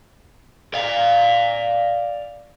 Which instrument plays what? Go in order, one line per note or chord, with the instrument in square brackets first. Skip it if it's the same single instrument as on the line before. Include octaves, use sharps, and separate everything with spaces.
[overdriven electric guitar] D5 F5